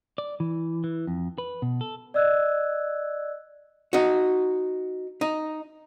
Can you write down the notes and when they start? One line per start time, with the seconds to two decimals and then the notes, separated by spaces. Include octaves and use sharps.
0.18 D5
0.40 E3
0.84 E3
1.07 F2
1.38 B4
1.62 B2
1.81 A4
2.14 D5 D#5 E6 F#6 G#6
3.93 D#4 F#4
5.21 D#4